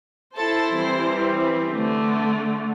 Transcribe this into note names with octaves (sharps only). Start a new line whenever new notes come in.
E4 A4 C5 A5 A6
E3 G3 C4
D3 A3